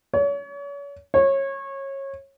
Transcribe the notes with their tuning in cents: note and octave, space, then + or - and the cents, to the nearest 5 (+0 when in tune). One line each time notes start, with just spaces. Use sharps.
C#5 +35
C#5 -25